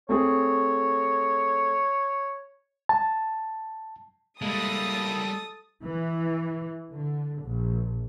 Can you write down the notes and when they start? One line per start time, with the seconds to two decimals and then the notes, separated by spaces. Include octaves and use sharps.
0.09 A3 C4 G#4 C#5
2.89 A5
4.42 G3 G#3 A#3 E4 A4 D#6 A6
5.84 E3
6.91 D3
7.43 A#1